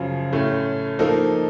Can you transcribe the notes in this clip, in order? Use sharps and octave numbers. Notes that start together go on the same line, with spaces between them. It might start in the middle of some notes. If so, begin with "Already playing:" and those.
Already playing: F#2 C#3 F3
A2 A3 C#4
F3 A#3 D#4 A4